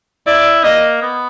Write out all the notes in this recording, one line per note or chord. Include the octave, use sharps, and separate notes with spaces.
E4 D5
A#3 D#5
B3